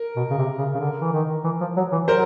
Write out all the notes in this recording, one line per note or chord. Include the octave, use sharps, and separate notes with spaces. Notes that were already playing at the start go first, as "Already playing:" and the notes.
Already playing: A#4
B2
C#3
C3
C#3
C#3
D3
E3
D#3
E3
F3
F#3
E3
F#3 A#4 C5